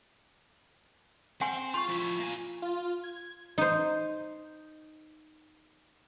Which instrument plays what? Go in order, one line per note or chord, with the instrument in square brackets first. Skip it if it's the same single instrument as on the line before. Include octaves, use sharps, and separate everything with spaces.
[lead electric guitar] C4 [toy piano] F#5 G#5 C6
[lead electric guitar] F4 [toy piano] C6 C#6
[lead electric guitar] F3 E4 [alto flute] F4
[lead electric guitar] A#3 G#5
[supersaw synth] F4
G#6
[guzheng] D#4 C5